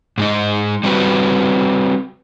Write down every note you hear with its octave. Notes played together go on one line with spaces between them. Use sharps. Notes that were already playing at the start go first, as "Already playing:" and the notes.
G#2 G#3 D#4
G3 C4 F#4 B4